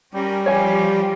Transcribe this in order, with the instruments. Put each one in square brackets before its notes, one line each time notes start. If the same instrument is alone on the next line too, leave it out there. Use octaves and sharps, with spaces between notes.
[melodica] G3 [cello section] C#4 G4 A#4
[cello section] F3 F4 G4 [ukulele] C#5 G#5